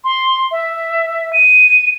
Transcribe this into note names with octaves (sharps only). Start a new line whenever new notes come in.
C6
E5
D#7